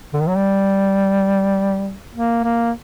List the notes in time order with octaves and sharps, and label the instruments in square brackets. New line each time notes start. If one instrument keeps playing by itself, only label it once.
[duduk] D3
D#3
F#3
G3
A#3
A#3